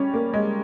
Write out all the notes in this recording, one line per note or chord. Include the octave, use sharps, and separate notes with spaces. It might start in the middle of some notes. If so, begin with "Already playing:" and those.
Already playing: G3 C#4
A#3
G#3